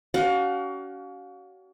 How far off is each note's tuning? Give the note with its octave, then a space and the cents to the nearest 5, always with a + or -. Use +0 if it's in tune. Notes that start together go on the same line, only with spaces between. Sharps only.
C#4 +35 F#4 +35 F5 +35